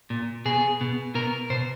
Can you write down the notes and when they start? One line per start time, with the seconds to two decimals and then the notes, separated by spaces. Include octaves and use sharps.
0.10 A#2
0.45 B2 G#4
0.81 B2
1.15 B2 A#4
1.50 B2 C5